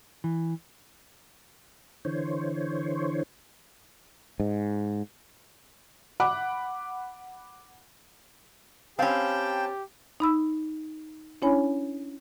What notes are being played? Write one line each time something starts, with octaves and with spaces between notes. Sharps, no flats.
E3
D3 E3 C5 C#5
G#2
F#5 B5 D6 F#6
C4 C#4 G4 F5 G5 A5 B5
D#4 B5 E6
C#4 D4 E4 C#5 G#5 B5